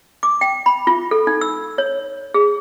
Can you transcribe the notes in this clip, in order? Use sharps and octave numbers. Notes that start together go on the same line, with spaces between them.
D6
G5
B5
F4
A4
D#4
E6
C#5
G#4